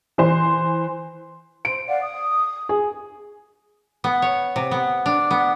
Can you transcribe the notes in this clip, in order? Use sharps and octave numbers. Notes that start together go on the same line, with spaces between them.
E3 C5 C6
C5 D7
D5 F5 F#5
D#6
G#4
B3
C#5
C3
B3
D4
B3